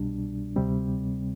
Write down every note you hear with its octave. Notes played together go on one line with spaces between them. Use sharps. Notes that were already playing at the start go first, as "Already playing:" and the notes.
Already playing: C2 B2 G3 D4
D2 C3 G3 C4